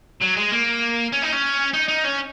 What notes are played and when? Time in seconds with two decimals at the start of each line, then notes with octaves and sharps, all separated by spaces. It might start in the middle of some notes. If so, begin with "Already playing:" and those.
0.21 F#3
0.36 G#3
0.52 A#3
1.13 C#4
1.23 D#4
1.33 C#4
1.74 D#4
1.89 D#4
2.05 C#4